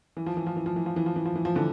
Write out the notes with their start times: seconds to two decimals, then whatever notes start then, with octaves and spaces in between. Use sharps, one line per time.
0.17 E3
0.26 F3
0.37 E3
0.47 F3
0.56 E3
0.66 F3
0.76 E3
0.86 F3
0.96 E3
1.06 F3
1.16 E3
1.26 F3
1.35 E3
1.45 F3
1.55 D3 E3